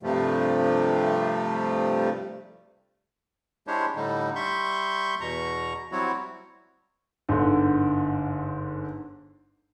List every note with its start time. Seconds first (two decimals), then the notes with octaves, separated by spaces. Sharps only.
0.03 G2 C3 F3 G3 A3
3.67 G#3 D4 E4 G4 C5 C#5
3.96 A2 D3 G3 D#4
4.36 G3 E5 C6 C#6 G6
5.21 E2 B2 A#5 C#6
5.92 F#3 G3 C4 E4 F#4 C#5
7.29 G1 G#2 D3